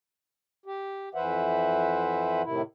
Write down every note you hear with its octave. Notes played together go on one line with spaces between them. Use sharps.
G4
F2 E3 B4 C5 E5 F#5
A2 C3 D#3 E4